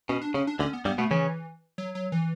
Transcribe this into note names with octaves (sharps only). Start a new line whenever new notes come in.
B2 C#4
D4
C#3 C#4
D4
D2 D3 C#4
B3
G2 G3 B3
B2 A3 B3
C#3 E3 C#4
F#3
F#3
E3